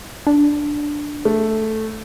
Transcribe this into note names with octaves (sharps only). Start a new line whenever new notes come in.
D4
A3